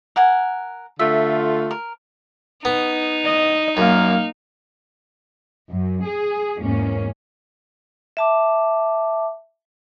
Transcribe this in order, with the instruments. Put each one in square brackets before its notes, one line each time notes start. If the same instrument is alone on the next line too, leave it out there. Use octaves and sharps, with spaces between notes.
[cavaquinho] A#4 F#5 G#5
[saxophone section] D3 A3 F4 [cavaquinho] E5
[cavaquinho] A#4
[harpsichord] B3 [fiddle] D#4
[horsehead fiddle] D#5
[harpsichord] F#2 [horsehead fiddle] A#3 F5
[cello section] F#2
G#4
E2 G#2 A#3 C#4
[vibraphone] E5 A5 D6